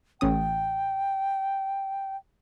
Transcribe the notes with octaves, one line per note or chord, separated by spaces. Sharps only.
A1 C#4 G5 D#6